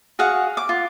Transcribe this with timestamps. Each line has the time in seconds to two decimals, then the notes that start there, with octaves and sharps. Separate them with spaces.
0.19 F#4 G#4 F5 F#5
0.57 D6
0.69 F4